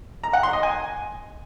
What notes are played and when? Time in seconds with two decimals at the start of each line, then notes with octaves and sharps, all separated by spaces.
0.23 A#5
0.33 F#5
0.43 C6
0.53 D#5
0.63 G#5